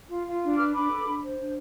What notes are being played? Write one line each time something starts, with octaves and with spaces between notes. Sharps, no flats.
F4
F4
D4
B4 D6 F6
D4 B5 D6
A4
D4
C5
D4